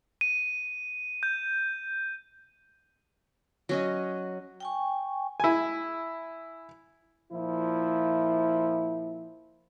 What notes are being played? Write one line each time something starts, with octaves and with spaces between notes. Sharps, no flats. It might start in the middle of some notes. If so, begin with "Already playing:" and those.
D#7
G6
F#3 C#4 D#5
G5 G#5 C#6
E4 G#5
A#2 F3 E4